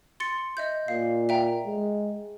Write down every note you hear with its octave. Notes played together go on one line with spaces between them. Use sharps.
C6 A6 C#7
D#5 E5 G6
A#2 F5
E5 G5 A#5
G#3